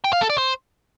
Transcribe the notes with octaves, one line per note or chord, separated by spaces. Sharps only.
G5
F5
A4
D5
C5